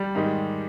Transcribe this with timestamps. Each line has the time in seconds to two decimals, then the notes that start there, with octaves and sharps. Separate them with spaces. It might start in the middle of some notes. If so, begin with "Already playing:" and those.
Already playing: G3
0.15 G#2 D#3 G#3 D#4 G4